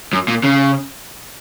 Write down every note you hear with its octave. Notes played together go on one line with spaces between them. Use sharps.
F#2
A#2
C#3